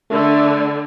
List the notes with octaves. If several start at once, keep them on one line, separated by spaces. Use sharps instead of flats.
D3 A3